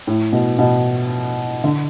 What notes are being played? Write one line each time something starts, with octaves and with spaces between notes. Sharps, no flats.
A2
B2
B2
D3